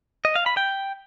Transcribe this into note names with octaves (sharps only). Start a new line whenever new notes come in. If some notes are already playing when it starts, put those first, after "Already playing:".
D#5
F5
B5
G5